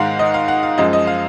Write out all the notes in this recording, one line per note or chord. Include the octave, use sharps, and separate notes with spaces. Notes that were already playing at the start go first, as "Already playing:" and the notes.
Already playing: G#2 D#3 G#3 F5 F#5
D#5
F5
F#5
F5
F#2 F3 G#3 D#5
D#5
F5